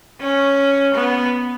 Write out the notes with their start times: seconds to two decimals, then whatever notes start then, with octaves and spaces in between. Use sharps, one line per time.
0.20 C#4
0.94 B3